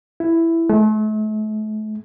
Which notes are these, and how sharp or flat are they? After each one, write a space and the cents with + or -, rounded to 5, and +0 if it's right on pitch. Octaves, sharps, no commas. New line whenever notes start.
E4 +5
A3 -40